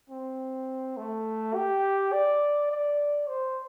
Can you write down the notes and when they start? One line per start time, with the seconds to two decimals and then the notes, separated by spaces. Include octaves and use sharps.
0.10 C4
0.97 A3
1.55 G4
2.13 D5
2.71 D5
3.29 C5